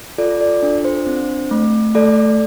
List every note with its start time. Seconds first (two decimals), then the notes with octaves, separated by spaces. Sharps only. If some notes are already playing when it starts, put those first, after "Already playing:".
0.18 F4 A4 D5
0.41 A4 D5
0.63 D4 A4
0.85 C5
1.06 C4
1.51 A3
1.95 A3 A4 D5